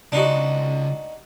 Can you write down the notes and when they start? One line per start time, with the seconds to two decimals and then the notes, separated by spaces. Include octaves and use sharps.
0.12 C#2 D4 D#4 F#4